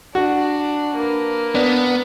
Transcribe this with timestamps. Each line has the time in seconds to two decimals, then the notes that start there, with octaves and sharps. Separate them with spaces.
0.15 D4 F#4
0.96 A#3 B4
1.55 B3 D4